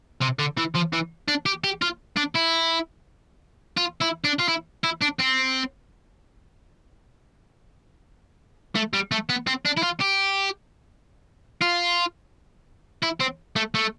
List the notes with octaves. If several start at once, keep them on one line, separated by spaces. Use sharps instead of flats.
C3
D3
E3
F3
E3
D4
G4
G4
F4
D4
E4
F4
E4
D4
F4
E4
E4
D4
C4
A3
G3
A3
B3
C4
D4
E4
F4
G4
F4
E4
C4
A3
A3